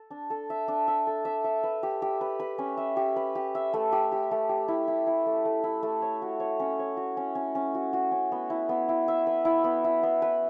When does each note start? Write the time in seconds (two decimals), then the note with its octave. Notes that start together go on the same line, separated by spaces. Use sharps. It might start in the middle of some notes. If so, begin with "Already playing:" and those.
Already playing: A4
0.10 D4
0.30 A4
0.50 E5
0.68 D4
0.88 E5
1.07 A4
1.25 E5
1.44 E5
1.63 B4
1.83 G4
2.02 G4
2.21 B4
2.40 B4
2.58 C#4
2.77 E5
2.97 G4
3.16 B4
3.35 G4
3.55 E5
3.74 A3
3.92 G4
4.12 G4
4.31 A3
4.49 G4
4.68 E4
4.88 E4
5.07 E4
5.26 A3
5.45 A3
5.64 E4
5.83 A3
6.02 C#5
6.22 F#4
6.40 C#5
6.60 C#4
6.79 C#5
6.97 F#4
7.17 C#4
7.35 C#4
7.55 C#4
7.75 F#4
7.93 F#4
8.12 C#4
8.32 B3
8.50 E4
8.69 B3
8.89 E4
9.08 E5
9.27 B4
9.45 E4
9.64 B3
9.84 E4
10.03 B3
10.22 B4